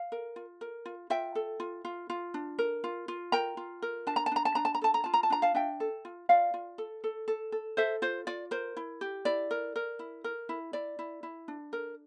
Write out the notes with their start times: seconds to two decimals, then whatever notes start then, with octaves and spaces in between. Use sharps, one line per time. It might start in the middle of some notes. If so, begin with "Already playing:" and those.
Already playing: F5
0.12 A#4
0.36 F4
0.61 A#4
0.85 F4
1.10 F4 E5 G5
1.35 A4
1.60 F4
1.85 F4
2.10 F4
2.34 D4
2.59 A#4
2.84 F4
3.08 F4
3.32 A#4 G5 A#5
3.57 F4
3.82 A#4
4.07 D4 A5
4.16 A#5
4.26 A5
4.32 D4 A#5
4.45 A5
4.55 D4 A#5
4.65 A5
4.74 A#5
4.82 A4 A5
4.94 A#5
5.04 F4 A5
5.14 A#5
5.23 A5
5.30 D4 A#5
5.42 F5 A5
5.54 D4 E5 G5
5.80 A4
6.05 F4
6.29 F4 D5 F5
6.54 F4
6.78 A4
7.04 A4
7.28 A4
7.52 A4
7.77 A4 C5 E5
8.02 F4 C5
8.27 F4 D5
8.51 A#4 C5
8.77 E4
9.01 G4
9.25 E4 D5
9.51 A#4
9.76 A#4
9.99 E4
10.24 A#4
10.49 E4
10.73 E4 D5
10.99 E4
11.23 E4
11.48 D4
11.73 A#4